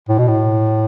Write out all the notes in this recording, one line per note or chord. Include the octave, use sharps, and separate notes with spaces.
A2
B2
A2